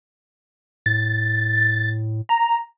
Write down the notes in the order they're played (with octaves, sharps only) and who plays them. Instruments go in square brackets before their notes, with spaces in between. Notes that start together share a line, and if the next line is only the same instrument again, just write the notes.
[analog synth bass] A2 [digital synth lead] A6
[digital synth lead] A#5